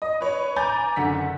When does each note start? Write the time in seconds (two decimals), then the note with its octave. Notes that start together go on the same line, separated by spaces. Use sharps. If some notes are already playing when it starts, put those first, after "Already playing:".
0.02 D#5
0.21 B4 C#5
0.56 G#5 A#5 D6 G6 A6
0.96 F#1 D3 F#5 B6